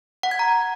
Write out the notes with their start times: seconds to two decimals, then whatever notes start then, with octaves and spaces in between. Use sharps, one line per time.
0.23 F#5
0.31 G#6
0.39 A#5